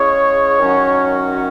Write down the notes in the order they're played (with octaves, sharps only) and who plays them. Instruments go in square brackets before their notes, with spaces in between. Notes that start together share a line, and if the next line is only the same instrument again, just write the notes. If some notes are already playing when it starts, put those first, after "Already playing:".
Already playing: [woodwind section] C#3 G#3 C#4 E4 G#4 [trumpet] C#5
[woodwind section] F#2 D#3 F#3 C#4 F#4